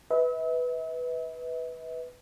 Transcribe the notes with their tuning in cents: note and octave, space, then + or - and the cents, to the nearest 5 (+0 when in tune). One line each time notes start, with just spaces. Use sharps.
B4 +0 E5 -45